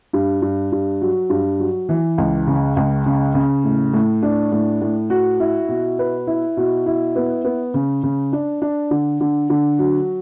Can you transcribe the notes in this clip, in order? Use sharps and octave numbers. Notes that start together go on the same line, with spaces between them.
G2
G2
G2
F#3
G2
F#3
E3
C#2
C#3
C#2
C#3
C#3
A2
A2
D4
A2
A2
F#4
E4
B2
B4
E4
B2
E4
B3
B3
C#3
C#3
D4
D4
D3
D3
D3
F#3